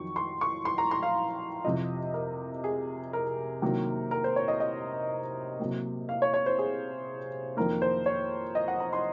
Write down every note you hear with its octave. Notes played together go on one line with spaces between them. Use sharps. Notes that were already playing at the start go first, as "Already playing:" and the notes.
Already playing: F2 D#3 F#3 C#6
C6
C#6
C6
A#5
C6
F5
F2 C3 F3 D#5
A#4
G#4
A#4
C3 D#3 F#3 A#3
A#4
C5
C#5
D#5
D#5
C3 F#3 A#3
F5
C#5
C#5
C5
G#4
F2 D#3 A#3 A#4
C5
C#5
D#5
F#5
A#5
C6